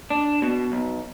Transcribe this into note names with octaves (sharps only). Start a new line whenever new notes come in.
D4
B2
B1